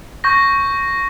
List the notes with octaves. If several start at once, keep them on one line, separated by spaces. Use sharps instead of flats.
C#6 G6 A#6